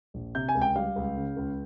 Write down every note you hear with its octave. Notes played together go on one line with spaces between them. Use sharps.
A#1
C3 G6
G#5
C#2
G5
G3 F5
C#2
C#3
C#2